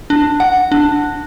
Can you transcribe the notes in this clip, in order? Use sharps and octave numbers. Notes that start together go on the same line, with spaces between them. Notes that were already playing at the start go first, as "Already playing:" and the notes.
D4
F#5
D4